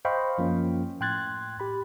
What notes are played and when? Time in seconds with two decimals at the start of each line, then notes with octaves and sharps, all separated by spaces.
0.05 C5 D#5 F5 G5 B5 C#6
0.38 F#2 F3 A#3 C#4
1.00 A2 G5 C6 F#6 G#6 A6
1.60 G4 B5